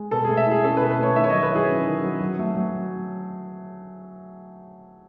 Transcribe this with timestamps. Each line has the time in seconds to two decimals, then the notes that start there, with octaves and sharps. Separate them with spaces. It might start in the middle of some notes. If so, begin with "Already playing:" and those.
Already playing: G#3
0.11 B2 A4
0.25 A3 G#4
0.37 E5
0.46 E4 G#4
0.63 C#4 A4
0.77 B2 B4
0.90 B4
0.99 A3 C#5
1.16 D#3 E5
1.24 C#5
1.30 F#3 D#5
1.43 B4
1.51 E4 G#4
1.69 C#4
1.86 D#3
2.04 F#3
2.21 F#3
2.39 A3
2.56 F#3